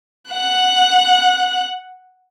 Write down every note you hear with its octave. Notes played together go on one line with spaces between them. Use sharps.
F#5 F#6